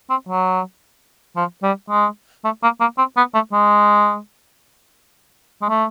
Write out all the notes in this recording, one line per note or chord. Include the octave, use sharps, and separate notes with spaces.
C4
F#3
F3
G3
G#3
A3
A#3
A#3
C4
B3
A3
G#3
G#3
A3